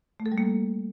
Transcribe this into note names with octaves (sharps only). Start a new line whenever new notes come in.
A3
A4
G3
A#3